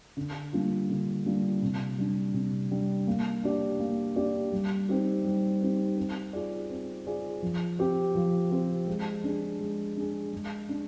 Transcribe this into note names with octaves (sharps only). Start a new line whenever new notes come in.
D3
G3 A#3 D4 F4
D3
G3 A#3 D4 F4
C3
G3 D4
C3
G3 D4
A#3
D4 G4 D5
A#3
D4 G4 D5
G3
C4 D#4 G4
G3
C4 D#4 G4
C4
F4 G#4 D5
C4
F4 G#4 D5
F3
C4 G4
F3
C4 G4
G#3
D4 G#4
G#3
D4 G#4
G#3
D4